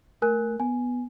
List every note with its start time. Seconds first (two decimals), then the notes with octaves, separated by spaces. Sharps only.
0.22 A3 A#4 G#5 F#6
0.60 B3 G#5